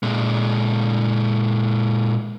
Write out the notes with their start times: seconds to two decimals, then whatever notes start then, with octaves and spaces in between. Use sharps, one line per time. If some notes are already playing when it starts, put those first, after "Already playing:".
0.03 A#2 G#3